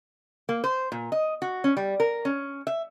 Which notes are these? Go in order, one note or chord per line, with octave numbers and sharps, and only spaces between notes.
A#3
C5
A#2
D#5
F#4
C#4
G3
A#4
C#4
E5